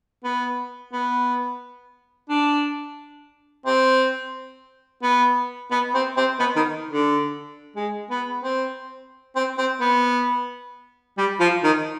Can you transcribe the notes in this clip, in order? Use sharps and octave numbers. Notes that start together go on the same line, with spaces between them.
B3
B3
D4
C4
B3
B3
C4
C4
B3
D#3
D3
G#3
B3
C4
C4
C4
B3
G3
F3
D#3